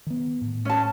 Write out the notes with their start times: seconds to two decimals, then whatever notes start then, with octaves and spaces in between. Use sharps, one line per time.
0.07 D#3 B3
0.41 A2
0.65 C#4 A5